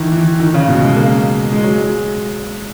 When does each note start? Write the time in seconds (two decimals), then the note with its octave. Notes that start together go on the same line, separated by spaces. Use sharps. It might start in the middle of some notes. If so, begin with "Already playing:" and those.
Already playing: D#3 E3
0.12 E3
0.40 D#3
0.54 C#3
0.68 B2
0.82 G#3
0.96 A#3
1.53 G#3
1.64 F#3
1.76 G#3